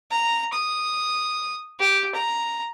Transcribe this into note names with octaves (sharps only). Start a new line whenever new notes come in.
A#5
D#6
G4
A#5